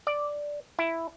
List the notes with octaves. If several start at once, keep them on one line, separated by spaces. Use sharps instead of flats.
D5
E4